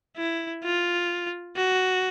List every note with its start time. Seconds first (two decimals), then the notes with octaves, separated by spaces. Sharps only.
0.17 E4
0.63 F4
1.57 F#4